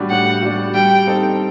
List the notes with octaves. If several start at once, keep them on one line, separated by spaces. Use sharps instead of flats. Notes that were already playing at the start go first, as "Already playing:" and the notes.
Already playing: A2 G3 D4 F#4
A2 F#5
G3 D4 F#4
G3 G5
C4 D#4 A4